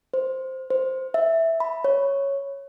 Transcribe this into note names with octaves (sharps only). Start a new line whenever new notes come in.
C5
C5
E5
B5
C#5